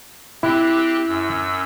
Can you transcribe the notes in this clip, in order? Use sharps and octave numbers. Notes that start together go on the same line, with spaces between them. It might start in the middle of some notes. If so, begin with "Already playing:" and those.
C4 E4 G4 F#6
F#2 E6